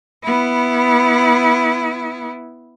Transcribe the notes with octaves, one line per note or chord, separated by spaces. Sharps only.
B3 E4